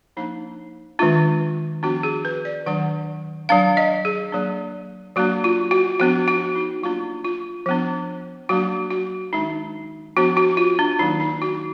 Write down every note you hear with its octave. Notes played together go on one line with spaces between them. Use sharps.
F3 A#3 D4 D#4
D#3 G#3 D4 F4
F3 B3 D4 F#4
G#4
B4
D5
D#3 F#3 D4 F#5
F#3 D4 F5
D#5
G#4
F#3 A#3 D4
F#3 A#3 D4 F#4
F4
F#4
F3 B3 D4 F#4
F#4
D#4
F#3 A#3 D4 F4
F4
F3 B3 D4
F#3 A#3 D4 F#4
F#4
D#3 G#3 D4 D#4
F3 B3 D4 F#4
F#4
F4
D4
D#3 F#3 A#3 D4 D#4
D#4
F#4